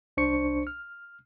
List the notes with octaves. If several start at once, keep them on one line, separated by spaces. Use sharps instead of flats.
C2 D4 C5 C#6 C#7
F6